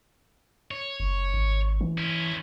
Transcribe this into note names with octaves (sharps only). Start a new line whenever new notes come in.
C#5
F#1
G#1
E3
C#4 E4